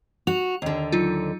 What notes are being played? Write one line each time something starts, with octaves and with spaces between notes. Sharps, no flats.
F#4 F7
D#2 D3
F#3 D#4 F4